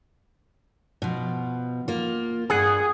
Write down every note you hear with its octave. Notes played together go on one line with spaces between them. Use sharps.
B2 F3
A#3 F4
G2 G#4 F#5